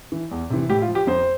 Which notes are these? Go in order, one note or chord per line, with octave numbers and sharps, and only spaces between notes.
E3
E2
C3 E3
A2 G4
F4
F3
G4
F2 C5